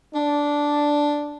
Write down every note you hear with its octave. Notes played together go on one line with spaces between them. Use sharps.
D4